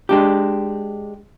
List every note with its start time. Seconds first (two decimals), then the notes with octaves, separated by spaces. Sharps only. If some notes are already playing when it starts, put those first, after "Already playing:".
0.09 G#3 D4 G4